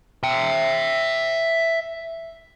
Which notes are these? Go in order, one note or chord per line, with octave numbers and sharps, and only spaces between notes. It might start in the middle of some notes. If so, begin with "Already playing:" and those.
E5 G5